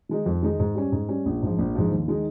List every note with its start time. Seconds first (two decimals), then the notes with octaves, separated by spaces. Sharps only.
0.09 D#3 G#3 D#4
0.26 F2
0.43 D#3 G#3 D#4
0.59 G#2
0.75 G3 C#4
0.92 G#2
1.09 G3 C#4
1.26 A#1
1.42 G#2 F3
1.59 A#1
1.75 G#2 F3
1.91 D#2
2.08 D#3 G#3 D#4